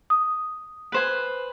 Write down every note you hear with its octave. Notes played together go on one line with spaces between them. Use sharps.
D#6
B4 C5 G#5